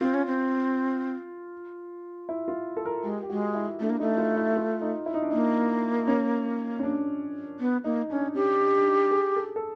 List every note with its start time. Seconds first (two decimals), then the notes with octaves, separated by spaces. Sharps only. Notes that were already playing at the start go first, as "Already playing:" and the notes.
0.01 C4 F4
0.14 C#4
0.26 C4
2.29 E4
2.48 F4
2.77 A4
2.85 A#4
3.04 G#3 G4
3.23 G4
3.30 G#3 F#4
3.55 E4
3.80 A3 D4
3.90 A#3
4.00 A3 D#4
4.18 F4
4.36 E4
4.56 F4
4.81 D#4
5.06 E4
5.14 D#4
5.23 D4
5.30 A#3 D#4
6.07 C#4
6.79 C#4
6.83 D4
7.60 B3
7.84 A#3 D#4
8.10 C#4 D4
8.34 C#4 G4
8.60 D4
8.76 D4
8.85 D#4
9.11 G#4
9.36 A4
9.56 A4